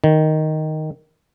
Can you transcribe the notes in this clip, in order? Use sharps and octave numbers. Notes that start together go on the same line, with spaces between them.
D#3